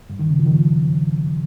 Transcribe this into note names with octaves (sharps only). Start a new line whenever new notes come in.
G2
D#3
C#3
F3
D#3
F3